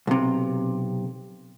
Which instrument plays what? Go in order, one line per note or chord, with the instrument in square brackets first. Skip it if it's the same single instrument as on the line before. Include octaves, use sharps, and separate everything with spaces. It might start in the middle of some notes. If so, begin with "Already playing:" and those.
[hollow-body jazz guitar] B1 C3